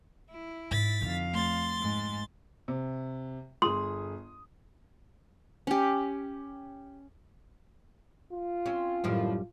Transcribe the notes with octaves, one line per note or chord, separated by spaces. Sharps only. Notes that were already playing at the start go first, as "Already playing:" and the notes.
E4
G#2 A6 B6
F2 D3 D#4 F5
A3 C6 A6
G#2
C3
G1 G#4 C6 D#6
C#4 G4
F4
C4 C#4
F#2 A2 D#3 F3 G3